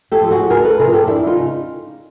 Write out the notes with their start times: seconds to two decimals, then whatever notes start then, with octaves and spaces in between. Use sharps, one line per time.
0.12 G4 A4
0.21 F3
0.31 F#4 G#4
0.50 D2 G#4 A#4
0.64 A4 B4
0.79 C3 F3 G#4 A#4
0.93 G4 A4
1.08 F2 D4 E4
1.26 D#4 F4
1.36 C#3